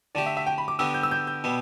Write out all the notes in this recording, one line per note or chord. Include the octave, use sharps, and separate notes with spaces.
D3 A3 G4 D5
E5
E5
G5
B5
D6
D3 B3 D4 G4 E6
G6
E6
G6
G6
B2 G3 B3